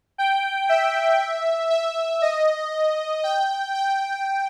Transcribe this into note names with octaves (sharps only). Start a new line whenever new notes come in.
G5
E5
E5
D#5
G5
G5